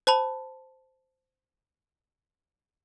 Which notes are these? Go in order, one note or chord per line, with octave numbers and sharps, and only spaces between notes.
C5 A5 B5